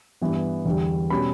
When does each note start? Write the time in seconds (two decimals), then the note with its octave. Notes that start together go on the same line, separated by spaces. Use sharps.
0.21 G2 E3 B3
0.65 E2 D3 G3
1.10 B2 G3 C#4 B5